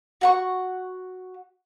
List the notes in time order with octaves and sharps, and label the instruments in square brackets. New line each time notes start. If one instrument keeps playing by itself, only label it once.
[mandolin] F#4 F#5 C#6